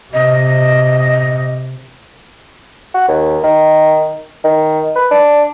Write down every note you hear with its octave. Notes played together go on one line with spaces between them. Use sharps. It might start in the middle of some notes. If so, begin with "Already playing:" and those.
C3 D#5
F#4
D#2
D#3
D#3
B4
D4